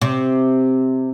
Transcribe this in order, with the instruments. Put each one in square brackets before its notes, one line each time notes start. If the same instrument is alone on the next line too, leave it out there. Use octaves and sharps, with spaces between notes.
[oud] C3